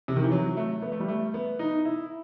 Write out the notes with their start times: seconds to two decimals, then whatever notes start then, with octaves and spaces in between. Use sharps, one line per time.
0.08 C3
0.16 D#3
0.24 E3
0.32 F#3
0.57 A3
0.82 B3
0.92 A3
1.00 G3
1.08 A3
1.34 B3
1.59 D#4
1.85 E4